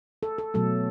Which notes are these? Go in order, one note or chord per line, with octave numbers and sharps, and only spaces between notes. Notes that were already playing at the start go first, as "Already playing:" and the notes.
A4
A4
B2 F#3 A3 A4